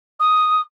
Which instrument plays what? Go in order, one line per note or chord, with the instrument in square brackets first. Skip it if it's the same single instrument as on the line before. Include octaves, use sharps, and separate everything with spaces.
[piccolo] D#6